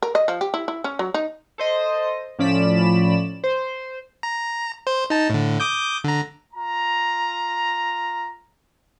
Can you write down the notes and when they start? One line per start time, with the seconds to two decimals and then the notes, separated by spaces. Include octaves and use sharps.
0.02 A#4
0.15 D#5
0.28 F3
0.41 G4
0.54 E4
0.68 E4
0.84 C#4
0.99 F#3
1.14 D#4
1.58 A4 C5 D#5
2.39 A2 F3 C#4 D5 B5 E7
3.44 C5
4.23 A#5
4.87 C5
5.10 D#4 A5
5.30 A2 D3
5.60 D6 D#6 G6
6.04 D3 A#5
6.54 F4 A#5